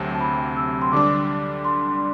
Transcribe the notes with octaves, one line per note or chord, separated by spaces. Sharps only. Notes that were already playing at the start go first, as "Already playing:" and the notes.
Already playing: D2 C3 F#3 C4 G4 A5
A5
B5
E6
C6
D3 G3 D4 D6
C6